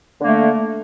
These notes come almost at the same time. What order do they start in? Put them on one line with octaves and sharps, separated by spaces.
D3 A#3 A3